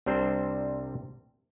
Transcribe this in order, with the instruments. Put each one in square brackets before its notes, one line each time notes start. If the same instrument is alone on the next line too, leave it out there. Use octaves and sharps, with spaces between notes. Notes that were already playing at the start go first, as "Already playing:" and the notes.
[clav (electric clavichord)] C2 C3 G3 C4 D4 C5